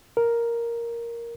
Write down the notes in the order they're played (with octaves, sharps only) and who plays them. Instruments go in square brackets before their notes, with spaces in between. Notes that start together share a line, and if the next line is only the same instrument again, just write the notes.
[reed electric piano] A#4